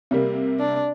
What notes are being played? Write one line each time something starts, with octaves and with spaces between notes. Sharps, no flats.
C3 G3 A#3
D4